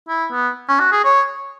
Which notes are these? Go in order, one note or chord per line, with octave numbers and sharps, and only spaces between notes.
E4
B3
C#4
F#4
G#4
C#5